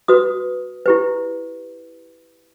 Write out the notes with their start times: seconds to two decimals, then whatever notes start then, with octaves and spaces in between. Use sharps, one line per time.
0.08 F#4 B4 D#6
0.86 E4 G4 B4